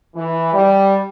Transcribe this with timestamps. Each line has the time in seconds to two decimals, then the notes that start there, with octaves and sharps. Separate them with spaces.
0.15 E3
0.53 G3